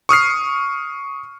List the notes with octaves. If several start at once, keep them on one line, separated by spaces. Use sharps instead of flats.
C#6 D#6 F6 C7